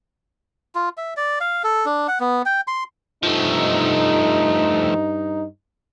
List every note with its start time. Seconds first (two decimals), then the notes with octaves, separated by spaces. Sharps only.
0.75 F4
0.97 E5
1.17 D5
1.41 F5
1.64 A4
1.86 D4
2.08 F#5
2.20 B3
2.46 G5
2.67 C6
3.23 G2 F3 A3 D#4